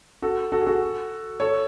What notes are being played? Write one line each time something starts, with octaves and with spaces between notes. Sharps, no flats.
F#4 A4
F#4 A4
G#4
F#4 A4
A4 C#5